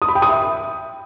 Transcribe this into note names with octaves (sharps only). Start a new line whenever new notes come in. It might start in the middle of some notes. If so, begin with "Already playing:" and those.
D#6
B5
G5
D#6
E5